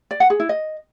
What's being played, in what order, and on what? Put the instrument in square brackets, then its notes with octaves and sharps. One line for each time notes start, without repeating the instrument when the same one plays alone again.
[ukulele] D5
F#5
G#4
E4
D#5